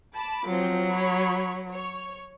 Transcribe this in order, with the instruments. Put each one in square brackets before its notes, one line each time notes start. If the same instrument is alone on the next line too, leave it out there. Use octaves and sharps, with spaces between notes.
[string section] A5 B5 D6
[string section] F3 C4 [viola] F#3
[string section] C#5 B5 C#6
C#5